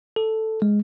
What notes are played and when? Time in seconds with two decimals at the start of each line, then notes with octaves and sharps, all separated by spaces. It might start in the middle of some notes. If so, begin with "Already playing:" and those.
0.16 A4
0.62 G#3